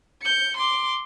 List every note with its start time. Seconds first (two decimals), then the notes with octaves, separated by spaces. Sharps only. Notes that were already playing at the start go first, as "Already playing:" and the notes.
0.22 G6 C#7
0.57 C6 D6